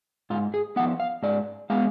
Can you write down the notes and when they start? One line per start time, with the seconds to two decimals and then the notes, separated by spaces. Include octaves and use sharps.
0.30 G#2 F4
0.54 G#4
0.76 F3 B3 F#5
1.00 F5
1.23 G#2 D5
1.70 G#3 B3 F5